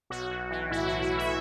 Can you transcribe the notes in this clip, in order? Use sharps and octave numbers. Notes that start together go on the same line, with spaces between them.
B1 F#4
B1
E3
A2 E4
F#4
B1
F#4
B1
E5